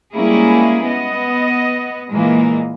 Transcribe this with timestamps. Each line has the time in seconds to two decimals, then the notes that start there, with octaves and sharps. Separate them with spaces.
0.14 G3 G#3 A#3 C#4 E4 G#4
0.86 B3 D#5
2.12 A#2 E3 G#3 A#3